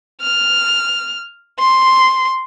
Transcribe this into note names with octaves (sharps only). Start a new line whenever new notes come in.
F6
C6